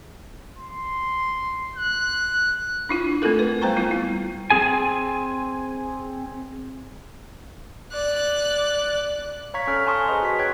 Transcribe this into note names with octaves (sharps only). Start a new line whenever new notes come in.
C6
F#6
D4 E4 F4
A3 C4 F4 A4 A#4
B4
G3 B3 C5 G5 A#5 C#6
G3 B3 E4 F4
E4
C4 G#4 G#5
D5 F#6
C#5 F5 A#5 C#6 G#6 B6
C#4 A4 A#5 F6
G#5 A5 C6 C#6 D#6
G#4 B4 C5 D#5 A#5
F#4 B6
C#5 G5 F#6 G#6